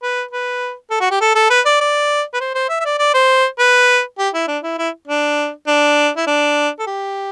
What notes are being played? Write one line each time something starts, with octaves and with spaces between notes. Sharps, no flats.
B4
B4
A4
F#4
G4
A4
A4
B4
D5
D5
B4
C5
C5
E5
E5
D5
D5
C5
B4
G4
E4
D4
E4
E4
D4
D4
E4
D4
A4
G4